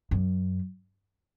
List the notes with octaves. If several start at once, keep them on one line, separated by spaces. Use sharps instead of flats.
F#2